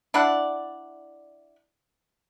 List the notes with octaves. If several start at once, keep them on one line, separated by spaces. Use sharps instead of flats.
D4 E4 D5 F#5